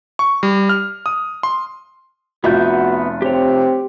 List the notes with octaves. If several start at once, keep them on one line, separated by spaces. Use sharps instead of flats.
C#6
G3
F6
D#6
C6
F1 B3 F4 F#4 E5 G6
C4 G4 C#5